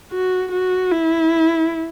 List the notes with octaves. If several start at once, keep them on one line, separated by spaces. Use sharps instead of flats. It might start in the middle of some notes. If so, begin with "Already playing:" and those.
F#4
F#4
E4